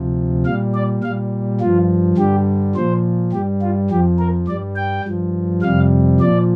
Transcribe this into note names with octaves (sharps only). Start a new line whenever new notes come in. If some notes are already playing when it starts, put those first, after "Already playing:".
Already playing: D2 C3 F3
A#2 G3 F5
D5
A#2 G3 F5
G2 F3 F4
G2 D3 G3 G4
A#2 F3 C5
G2 G3 G4
F4
F2 F3 G4
A#4
G2 G3 D5
G5
G2 F3
F2 C3 G3 F5
A#2 F3 D5